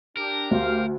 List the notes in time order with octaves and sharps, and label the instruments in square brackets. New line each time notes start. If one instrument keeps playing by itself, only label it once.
[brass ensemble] D4 G4 [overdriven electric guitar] A#4
[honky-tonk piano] D2 [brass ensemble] G4 C5 F5